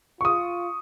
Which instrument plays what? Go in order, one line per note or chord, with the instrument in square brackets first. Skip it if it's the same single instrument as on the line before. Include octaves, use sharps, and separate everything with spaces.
[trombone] F4 [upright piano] C#6 D#6